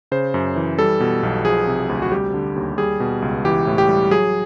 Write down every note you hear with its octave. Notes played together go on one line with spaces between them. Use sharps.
C#3 C5
F#2
E3
G3 A4
B2
B1
F3 G#4
C3
D2
F#4
G3 G4
D3
D#2
G3 G#4
B2
C#2
E3 G4
A2
G4
G3
F#3 G#4